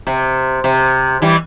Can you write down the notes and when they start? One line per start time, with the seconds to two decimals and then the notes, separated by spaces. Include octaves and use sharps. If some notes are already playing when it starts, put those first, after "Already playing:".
0.07 C3
0.64 C3
1.22 E3 G3